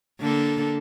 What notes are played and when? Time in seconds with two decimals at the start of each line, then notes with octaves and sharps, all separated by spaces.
0.20 D3 A#3 A4